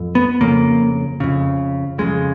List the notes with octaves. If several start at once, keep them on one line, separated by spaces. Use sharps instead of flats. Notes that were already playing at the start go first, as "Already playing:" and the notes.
Already playing: F2
B3
F2 C#3 A#3
F2 C#3
F2 C#3 G#3